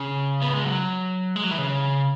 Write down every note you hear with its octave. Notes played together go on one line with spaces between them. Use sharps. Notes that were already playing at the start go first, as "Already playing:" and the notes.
Already playing: C#3
B3
G#3
F#3
G#3
F#3
E3
C#3